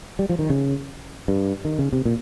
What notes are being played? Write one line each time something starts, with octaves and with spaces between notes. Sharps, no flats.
G3
F3
D#3
C#3
G2
D#3
C#3
C3
A#2